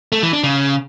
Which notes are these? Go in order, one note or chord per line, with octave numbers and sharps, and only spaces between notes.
A3
E3
D4
C#3